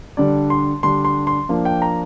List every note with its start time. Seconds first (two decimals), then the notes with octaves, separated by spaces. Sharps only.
0.17 D3 G3 D4 D5
0.50 C6
0.83 D3 G3 D4 C6
1.05 C6
1.27 C6
1.49 F3 A#3 D4
1.65 G5
1.82 A#5